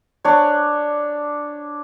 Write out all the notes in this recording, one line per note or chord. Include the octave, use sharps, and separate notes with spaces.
D4 C#5